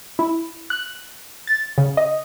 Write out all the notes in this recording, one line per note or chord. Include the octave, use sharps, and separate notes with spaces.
E4
F#6
A6
C#3
D#5